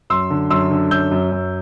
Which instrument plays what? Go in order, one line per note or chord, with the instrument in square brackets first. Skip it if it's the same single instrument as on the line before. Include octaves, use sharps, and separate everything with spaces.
[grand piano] F#2 C6 E6
D3
F#2 C6 E6
D3
F#2 E6 G6
F#2
F#2